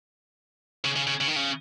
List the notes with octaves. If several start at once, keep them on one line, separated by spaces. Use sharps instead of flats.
C#3
C#3
C#3
C#3
D#3
C#3